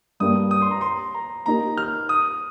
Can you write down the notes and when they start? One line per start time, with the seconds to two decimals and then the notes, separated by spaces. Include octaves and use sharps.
0.20 G2 G3 A#3 D#6
0.51 D#6
0.62 C6
0.71 A#5
0.81 C6
1.15 A#5
1.46 A#3 D#4 G4 A#4 A#5
1.78 F6
2.09 D#6